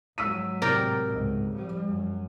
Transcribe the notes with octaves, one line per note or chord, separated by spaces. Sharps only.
G#1 F#3 E6 B6 D#7
A2 C3 A#4 D5 G5
C#2 G#2
F3 G3
F#2